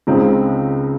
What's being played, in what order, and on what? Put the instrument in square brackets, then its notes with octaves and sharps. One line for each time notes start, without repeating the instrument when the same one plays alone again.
[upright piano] C#2 C#3 G#3 C4 D#4